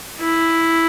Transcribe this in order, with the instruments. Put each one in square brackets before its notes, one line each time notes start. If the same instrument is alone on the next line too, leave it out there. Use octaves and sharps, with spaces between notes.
[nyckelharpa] E4